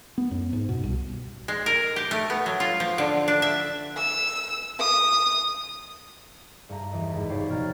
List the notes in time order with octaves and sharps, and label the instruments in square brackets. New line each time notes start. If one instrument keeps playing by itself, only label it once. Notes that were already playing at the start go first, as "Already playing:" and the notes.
[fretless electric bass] B3
F#2
G#2
B2
C2
[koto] G#3
A#4
G4
A3
B3
F#3
F4
F3
D3
D4
E5
[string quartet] E6
D#6
[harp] G2 A3 G4 A#5 D#7
E2 E3 D#5 D7 D#7
G#1 B4
F1 G4 C#5 D5 C7 D7
B2 F3 A#3 A#5 F6 A6